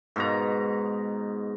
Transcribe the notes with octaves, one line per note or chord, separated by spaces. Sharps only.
G#2 B2 A#5